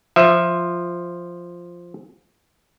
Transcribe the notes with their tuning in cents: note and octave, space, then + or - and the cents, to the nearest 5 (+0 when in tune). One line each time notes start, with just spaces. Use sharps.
F3 +0 E5 +10